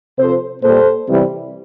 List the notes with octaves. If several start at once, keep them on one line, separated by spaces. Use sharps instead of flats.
C3 F3 A4 C5
A#2 G3 A4 C5
C3 E3 G3